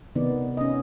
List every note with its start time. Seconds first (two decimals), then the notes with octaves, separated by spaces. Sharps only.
0.15 C3 D#3 B3 D#4 D5
0.57 C#4 D#5